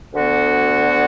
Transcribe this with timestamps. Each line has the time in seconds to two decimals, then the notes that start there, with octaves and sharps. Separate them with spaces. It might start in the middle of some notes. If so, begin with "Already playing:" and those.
0.13 D2 D3 B3 F#4